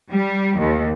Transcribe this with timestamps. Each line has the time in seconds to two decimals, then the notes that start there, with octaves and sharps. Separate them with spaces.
0.11 G3
0.59 D#2